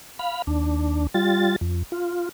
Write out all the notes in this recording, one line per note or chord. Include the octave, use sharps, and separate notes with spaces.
F5 B5
D#2 D4
G3 F4 A6
F2
F4